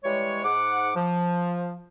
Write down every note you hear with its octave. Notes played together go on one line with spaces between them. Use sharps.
E3 G3 G#3 C#5
G#2 F#5 D6
F3